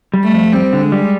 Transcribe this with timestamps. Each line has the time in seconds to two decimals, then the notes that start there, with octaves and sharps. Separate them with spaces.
0.14 G3
0.24 A3
0.33 F2
0.52 G3 C4
0.73 D3
0.82 G#3
0.92 G3